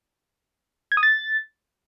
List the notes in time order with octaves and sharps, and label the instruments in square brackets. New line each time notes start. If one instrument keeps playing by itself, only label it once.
[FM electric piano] G#6
D#6
A6